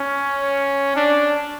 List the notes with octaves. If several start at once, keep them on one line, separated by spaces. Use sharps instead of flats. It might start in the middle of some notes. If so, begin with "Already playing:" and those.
Already playing: C#4
D4